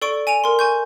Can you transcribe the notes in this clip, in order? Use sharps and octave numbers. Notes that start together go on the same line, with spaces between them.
A4 D5 C#6 D7
G#5 D7 D#7 F7
A#4 C6
G#5 C#6 G6